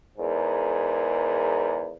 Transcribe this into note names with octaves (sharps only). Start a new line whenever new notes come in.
E2 G#2 A#4